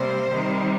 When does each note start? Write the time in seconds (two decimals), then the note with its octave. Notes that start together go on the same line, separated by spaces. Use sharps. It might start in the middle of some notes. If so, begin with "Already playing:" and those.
Already playing: C3 G3 A#3 C5
0.30 C3 D#3 G3